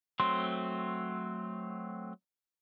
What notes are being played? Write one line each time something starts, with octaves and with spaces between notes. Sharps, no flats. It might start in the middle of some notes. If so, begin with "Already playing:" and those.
F#3 A3 C4 C6